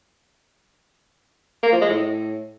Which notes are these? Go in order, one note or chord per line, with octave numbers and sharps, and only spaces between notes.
A#3
F3
G#3
A2